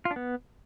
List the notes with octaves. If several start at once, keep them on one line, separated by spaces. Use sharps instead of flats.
F4
D4
B3